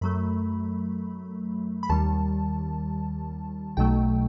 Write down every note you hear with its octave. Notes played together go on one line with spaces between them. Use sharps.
F#2 F#3 A3 B5
B5
D#2 D#3 G3 A5
B1 B2 F#3 A3 G5